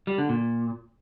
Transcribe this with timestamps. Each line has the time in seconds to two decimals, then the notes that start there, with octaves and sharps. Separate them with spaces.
0.07 G3
0.18 D3
0.29 A#2